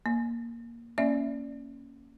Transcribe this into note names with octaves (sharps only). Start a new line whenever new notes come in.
A#3
A#3 C#4 D5 E5